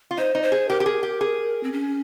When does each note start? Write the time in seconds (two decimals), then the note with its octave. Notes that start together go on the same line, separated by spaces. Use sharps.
0.11 F4
0.17 D#4 C5
0.35 D#4
0.43 C5
0.52 G#4
0.69 G4 A#4
0.80 G4
0.86 G#4
1.03 G4
1.21 G#4
1.63 C4
1.72 C#4